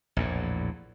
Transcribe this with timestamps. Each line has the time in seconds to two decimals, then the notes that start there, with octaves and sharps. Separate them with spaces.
0.17 A#1 E2 A2